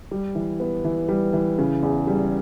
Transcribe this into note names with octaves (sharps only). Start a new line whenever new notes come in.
G3
E3
B3
E3
G3
E3
C#3
E2
G3